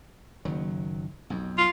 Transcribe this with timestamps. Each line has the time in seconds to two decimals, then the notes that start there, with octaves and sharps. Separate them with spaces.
0.45 F#1 D#3 F#3
1.30 B1 F2
1.58 F4